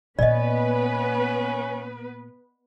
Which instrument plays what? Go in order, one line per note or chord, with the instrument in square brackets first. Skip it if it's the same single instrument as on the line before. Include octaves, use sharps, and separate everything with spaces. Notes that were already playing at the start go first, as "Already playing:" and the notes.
[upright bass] A#2 A#3 [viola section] B3 B4 [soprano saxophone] C#4 [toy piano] D5 D#5